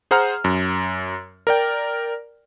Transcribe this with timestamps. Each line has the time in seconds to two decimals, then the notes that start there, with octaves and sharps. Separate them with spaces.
0.11 G#4 C5 F#5 A#5 F6
0.44 F#2
1.47 A#4 D5 G5